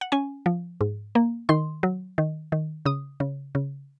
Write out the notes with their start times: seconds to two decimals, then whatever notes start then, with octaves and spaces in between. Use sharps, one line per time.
0.01 F#5
0.12 C#4 G#5
0.46 F3
0.81 G#2
1.15 A#3
1.49 D#3 C6
1.83 F#3
2.18 D#3
2.52 D#3
2.85 C#3 D#6
3.20 C#3
3.55 C#3